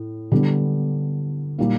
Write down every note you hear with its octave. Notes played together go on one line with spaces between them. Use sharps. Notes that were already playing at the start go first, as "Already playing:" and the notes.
Already playing: A2
D3 G3 B3
A#2 G3 A#3 D#4